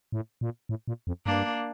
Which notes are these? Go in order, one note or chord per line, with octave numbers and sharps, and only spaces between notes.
A2
A#2
A2
A#2
F2
G2 A#3 D4